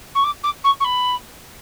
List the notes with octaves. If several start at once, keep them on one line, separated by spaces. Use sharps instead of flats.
C#6
D6
D6
C#6
C#6
B5